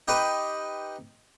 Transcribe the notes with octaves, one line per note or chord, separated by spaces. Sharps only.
D#4 G4 B4 B5